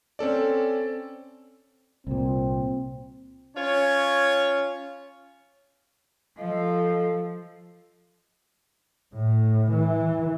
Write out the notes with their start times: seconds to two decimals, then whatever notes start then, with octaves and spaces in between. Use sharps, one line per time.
0.19 C4 C#4 A4 D5
2.07 C2 A#2 C4
3.55 C#4 F4 C#5
6.38 F3 A4 D#5 F5
9.14 A2
9.72 E3